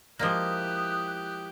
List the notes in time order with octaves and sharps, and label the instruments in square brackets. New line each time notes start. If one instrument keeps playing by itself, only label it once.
[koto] F3 G#3 A#3 [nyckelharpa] E4 G4 [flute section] D#6 F#6